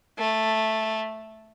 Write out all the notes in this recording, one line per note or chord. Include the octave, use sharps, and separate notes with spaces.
A3